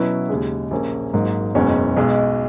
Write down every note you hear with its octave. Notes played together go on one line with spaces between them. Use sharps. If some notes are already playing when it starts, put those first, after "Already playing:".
Already playing: B2 F#3 C#4 E4 B4
D#2 C#3 G#3
A#1 A#2 A#3 C#4 G#4
G#1 G#2 F#3 A#3 D#4
F#1 E2 B2 G#3 C#4
B1 B2 G#3